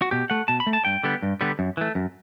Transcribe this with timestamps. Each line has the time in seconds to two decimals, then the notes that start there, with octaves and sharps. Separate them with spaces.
0.02 F#4
0.11 B2 G4
0.30 A3 F#5
0.48 B2 A5
0.60 B5
0.67 A3
0.73 A5
0.85 G2 G5
1.04 D3 G3 B3
1.22 G2
1.41 D3 G3 B3
1.59 F#2
1.77 E3 A3
1.95 F#2